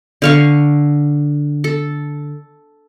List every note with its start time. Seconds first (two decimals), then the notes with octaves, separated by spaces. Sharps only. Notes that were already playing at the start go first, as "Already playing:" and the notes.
0.22 D3 F5 C#6
1.64 A4